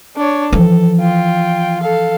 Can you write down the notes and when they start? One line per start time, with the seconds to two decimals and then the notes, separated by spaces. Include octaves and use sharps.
0.17 D4 C#5
0.53 E3 F3 A4
1.00 F4 G5
1.82 A4 F5